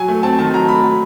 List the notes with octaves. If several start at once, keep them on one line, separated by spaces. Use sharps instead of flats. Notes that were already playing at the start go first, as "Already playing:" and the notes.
Already playing: F#3 G#5
A3
C4 A5
D#3 A5
F#3 A#5
A3 B5
F#3